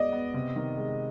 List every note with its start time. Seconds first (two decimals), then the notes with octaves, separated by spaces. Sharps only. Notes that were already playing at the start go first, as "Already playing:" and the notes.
Already playing: G#3 B3 D5 D#5
0.12 B3
0.34 C3
0.56 D#3
0.78 G#3